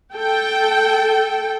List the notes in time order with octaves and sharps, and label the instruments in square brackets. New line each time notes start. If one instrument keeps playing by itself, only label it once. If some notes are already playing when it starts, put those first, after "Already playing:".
[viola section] A4 G5